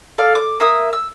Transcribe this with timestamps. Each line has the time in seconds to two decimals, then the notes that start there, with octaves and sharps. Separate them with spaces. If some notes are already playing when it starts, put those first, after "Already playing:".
0.18 A4 D5 F5
0.35 D6
0.60 A#3 E5 D#6
0.93 E6